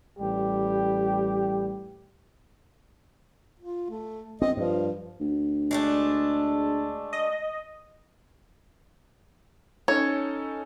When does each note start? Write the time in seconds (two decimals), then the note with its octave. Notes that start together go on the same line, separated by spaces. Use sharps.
0.18 A1 G3 G4
3.60 F4
3.90 A3
4.42 C4 D#5
4.57 G2 F3
5.20 D2
5.71 G#3 A3 D4
7.13 D#5
9.88 C#4 D#4 A4 C#5